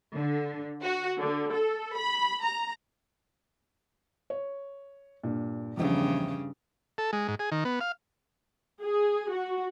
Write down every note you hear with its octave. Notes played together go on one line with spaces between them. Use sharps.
D3
F#4
D3
A4
B5
A#5
C#5
G2 A#2
A#1 E2 G2 C#3
A4
G#3
G#2
G#4
D#3
B3
F5
G#4
F#4